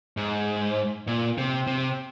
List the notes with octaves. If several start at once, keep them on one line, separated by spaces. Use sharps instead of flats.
G#2
A#2
C3
C3